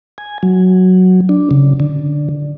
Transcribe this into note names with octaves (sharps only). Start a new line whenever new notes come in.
G#5
F#3
D4
C#3
D3